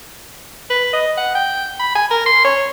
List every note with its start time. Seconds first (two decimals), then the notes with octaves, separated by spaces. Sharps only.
0.70 B4
0.93 D#5
1.17 F#5
1.35 G5
1.80 B5
1.95 G#5
2.11 A#4
2.26 C6
2.45 C#5